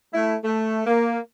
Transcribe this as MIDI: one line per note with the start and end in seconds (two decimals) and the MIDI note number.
0.13 0.34 57
0.13 0.34 64
0.44 0.82 57
0.86 1.19 58